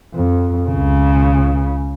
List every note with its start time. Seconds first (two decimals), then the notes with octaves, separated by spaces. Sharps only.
0.14 F2
0.68 C#2 C#3